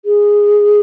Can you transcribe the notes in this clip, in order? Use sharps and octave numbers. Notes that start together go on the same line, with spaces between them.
G#4